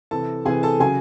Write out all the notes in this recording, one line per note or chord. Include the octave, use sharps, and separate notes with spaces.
C3 E3 A4 A5
C3 E3 G#4 G#5
A4 A5
C#3 F#3 G#4 G#5